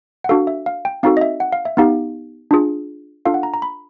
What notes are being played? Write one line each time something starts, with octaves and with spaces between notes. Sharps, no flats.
F#5
D4 F#4 A4 F5
E5
F5
G5
C4 D#4 F#4 A4 F5
D#5
E5
F#5
F5
E5
B3 D#4 G4 F5
D4 F4 G#4
D4 F4 A4 F5
F#5
A#5
A#5
B5